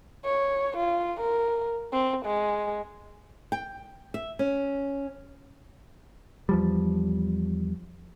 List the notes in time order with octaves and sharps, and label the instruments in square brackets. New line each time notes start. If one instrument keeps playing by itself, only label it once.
[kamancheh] C#5
F4
A#4
C4
G#3
[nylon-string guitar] G5
E5
C#4
[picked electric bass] E2 F3 G3